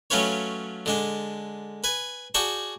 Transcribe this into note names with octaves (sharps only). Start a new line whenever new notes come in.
F#3 A3 C#4 F4 B4 C#5
D3 G#3 D4
B4 G#5
F#4 G#4 D5 G5 A5 C#6